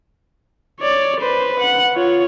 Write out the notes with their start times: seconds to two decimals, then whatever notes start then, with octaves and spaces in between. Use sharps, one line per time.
0.80 C#5 D5
1.20 B4 C5
1.60 F#5
1.94 F4 C#5